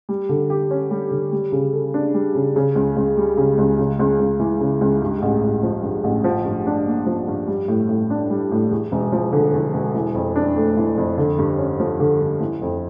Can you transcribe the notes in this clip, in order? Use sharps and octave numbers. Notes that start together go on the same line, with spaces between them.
G3
D3
G4
C#4
G3
D3
G3
C#3
A4
D4
G3
C#3
C#3
C#2
C#2
G3
C#3
C#2
C#3
C#2
C#2
E3
C#3
C#2
G2
A1
A1
F3
G2
A1
F3
G2
D4
A#3
F3
G2
G3
A2
A2
D4
G3
A2
E2
E1
F3
D3
E2
E1
E3
F2
D4
A3
E3
F2
D3
G2
C#4
F3
D3
G2
E3
F2